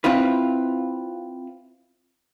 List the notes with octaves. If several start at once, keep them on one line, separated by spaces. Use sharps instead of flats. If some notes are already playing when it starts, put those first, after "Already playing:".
C4 E4 F4 B4